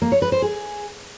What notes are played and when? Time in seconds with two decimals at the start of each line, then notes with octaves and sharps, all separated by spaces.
0.02 A#3
0.12 C#5
0.22 B4
0.32 C5
0.42 G#4